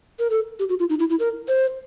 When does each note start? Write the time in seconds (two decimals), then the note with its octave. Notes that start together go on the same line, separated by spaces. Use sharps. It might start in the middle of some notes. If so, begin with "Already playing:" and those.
0.19 A#4
0.30 A4
0.59 G4
0.69 F#4
0.79 F4
0.90 D#4
0.99 E4
1.10 E4
1.20 A#4
1.48 C5